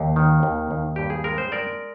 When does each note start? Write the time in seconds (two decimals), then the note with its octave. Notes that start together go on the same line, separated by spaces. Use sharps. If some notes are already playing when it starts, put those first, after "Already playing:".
Already playing: D#2
0.16 D#3
0.43 D#2
0.71 D#2
0.96 G2 G4
1.10 G#4
1.24 G#3 A#4
1.38 C5
1.52 G#3 A#4 D5